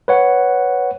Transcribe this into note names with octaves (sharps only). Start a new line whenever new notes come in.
B4 C#5 F#5